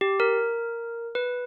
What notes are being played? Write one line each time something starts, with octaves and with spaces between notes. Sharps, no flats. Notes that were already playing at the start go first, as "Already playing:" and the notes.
G4
A#4
B4